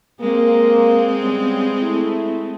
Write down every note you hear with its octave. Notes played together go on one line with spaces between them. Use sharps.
G#3 A#3 C4
C#3 G3 B3
A3 E4